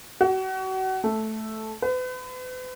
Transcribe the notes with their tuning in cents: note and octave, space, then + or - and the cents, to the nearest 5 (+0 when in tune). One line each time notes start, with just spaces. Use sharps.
F#4 +35
A3 -5
B4 +40